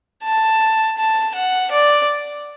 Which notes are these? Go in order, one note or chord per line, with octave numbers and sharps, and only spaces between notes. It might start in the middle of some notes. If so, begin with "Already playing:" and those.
A5
A5
F#5
D5